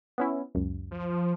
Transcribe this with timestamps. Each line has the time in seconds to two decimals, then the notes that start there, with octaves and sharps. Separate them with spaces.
0.18 B3 C#4 E4
0.55 C#2 F#2
0.91 F3